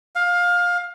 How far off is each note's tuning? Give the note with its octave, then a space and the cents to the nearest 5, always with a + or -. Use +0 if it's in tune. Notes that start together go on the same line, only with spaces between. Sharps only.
F5 +20